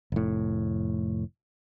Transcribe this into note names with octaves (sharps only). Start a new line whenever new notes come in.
F1 A2